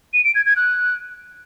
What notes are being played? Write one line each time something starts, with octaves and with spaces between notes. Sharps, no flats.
D#7
D7
G#6
G#6
F#6